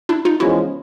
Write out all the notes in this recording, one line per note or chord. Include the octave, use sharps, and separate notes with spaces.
D4 E4
D#4 F4
E2 C#3 F3 G#3 C#4 E4 F#4